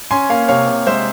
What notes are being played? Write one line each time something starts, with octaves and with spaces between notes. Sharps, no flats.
C#4 G#5 C6
A#3 F5 G#5
C3 C#5 F5
C3
G#3 C5 E5